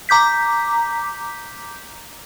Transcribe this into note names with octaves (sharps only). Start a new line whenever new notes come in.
A#5 D6 G6 B6